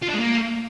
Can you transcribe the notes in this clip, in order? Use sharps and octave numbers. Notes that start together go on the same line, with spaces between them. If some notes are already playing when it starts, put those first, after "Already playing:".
F4
D4
G#3
A#3